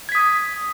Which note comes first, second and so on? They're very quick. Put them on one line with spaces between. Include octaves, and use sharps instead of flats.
G#6 B6 D#6